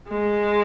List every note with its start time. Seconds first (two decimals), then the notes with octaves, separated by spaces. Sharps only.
0.08 G#3